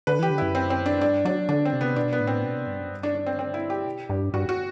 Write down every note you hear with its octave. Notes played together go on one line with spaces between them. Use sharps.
D3 B4
E3 G4
D3
F#2 E4
C4
C4
D4
G2 D4
F#3 D4
D3 D4
C4
C3
B3
B2 D4
B3
A2
C4
B2
C3
G2
F#2
G2
D4
D4
C4
C4
E4
G4
B2
G2
G2 F#4
F#4